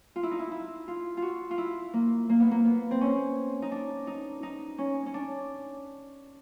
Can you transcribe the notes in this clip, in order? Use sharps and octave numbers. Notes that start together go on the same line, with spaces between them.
F4
E4
D#4
E4
E4
F4
F4
F#4
F4
E4
A#3
A#3
B3
A#3
B3
C4
C#4
D#4
D4
D#4
D#4
C#4
C#4
D4